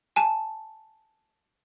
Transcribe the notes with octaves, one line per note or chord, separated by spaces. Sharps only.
G#5 A5